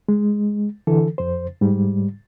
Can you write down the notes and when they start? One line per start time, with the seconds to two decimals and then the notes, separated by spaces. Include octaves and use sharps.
0.09 G#3
0.87 D3 E3 A4
1.18 F2 C5
1.61 G#2 G3